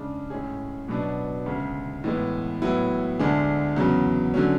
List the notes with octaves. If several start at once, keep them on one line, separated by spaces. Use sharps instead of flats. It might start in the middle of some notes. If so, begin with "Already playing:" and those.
Already playing: C#3 G#3 D4
A2 G#3 C#4 G#4
B2 F#3 B3 D4
D2 C#3 G#3
A2 E3 G#3 B3
A2 F#3 B3 E4
D2 D3 G#3 D4 G#4
E2 C#3 F#3
D3 F#3 C#4